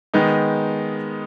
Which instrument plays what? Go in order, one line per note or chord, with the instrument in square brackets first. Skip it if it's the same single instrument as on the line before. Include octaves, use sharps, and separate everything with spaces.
[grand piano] D#3 G#3 B3 D#4